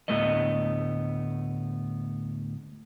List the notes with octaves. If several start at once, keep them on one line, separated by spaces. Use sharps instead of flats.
D2 A2 A3 B3 D#5